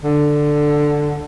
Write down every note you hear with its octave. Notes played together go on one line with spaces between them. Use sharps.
D3